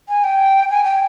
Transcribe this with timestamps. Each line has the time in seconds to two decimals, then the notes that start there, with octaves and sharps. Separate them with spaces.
0.09 G#5
0.24 G5
0.70 G#5
0.85 G5